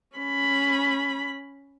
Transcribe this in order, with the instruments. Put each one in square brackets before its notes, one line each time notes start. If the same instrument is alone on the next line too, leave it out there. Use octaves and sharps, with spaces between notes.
[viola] C#4 B5